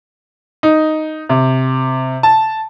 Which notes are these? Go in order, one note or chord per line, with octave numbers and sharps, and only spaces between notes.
D#4
C3
A5